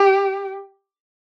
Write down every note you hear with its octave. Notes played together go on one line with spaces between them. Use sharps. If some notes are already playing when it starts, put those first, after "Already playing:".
Already playing: G4